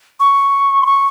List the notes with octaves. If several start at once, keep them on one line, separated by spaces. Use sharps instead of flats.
C#6
C6
C#6